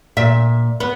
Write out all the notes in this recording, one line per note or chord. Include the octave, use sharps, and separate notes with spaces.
A#2 E5
B3